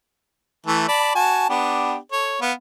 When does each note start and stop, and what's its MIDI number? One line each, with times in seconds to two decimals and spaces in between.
0.66 0.87 52
0.66 0.87 57
0.66 0.87 81
0.88 1.11 74
0.88 1.11 81
0.88 1.11 83
1.15 1.46 66
1.15 1.46 80
1.15 1.46 81
1.49 1.96 59
1.49 1.96 62
1.49 1.96 67
2.12 2.38 69
2.12 2.38 73
2.42 2.52 59
2.42 2.52 77